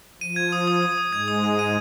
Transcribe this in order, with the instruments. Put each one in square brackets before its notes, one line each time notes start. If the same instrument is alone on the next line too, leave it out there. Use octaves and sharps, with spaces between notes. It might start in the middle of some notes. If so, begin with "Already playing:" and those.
[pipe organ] F3 [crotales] D#7
[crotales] G#6
D#6
D#6
D#6
D#6
[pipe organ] G#2 G#3 [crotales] G#6
[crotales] D#6
D#7
D#7